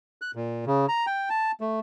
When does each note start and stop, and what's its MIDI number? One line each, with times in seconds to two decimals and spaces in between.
0.22 0.31 90
0.35 0.65 46
0.67 0.86 49
0.88 1.06 82
1.07 1.29 79
1.30 1.52 81
1.61 1.80 57